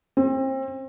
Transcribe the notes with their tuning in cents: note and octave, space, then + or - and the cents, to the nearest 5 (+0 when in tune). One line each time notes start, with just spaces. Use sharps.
C4 +30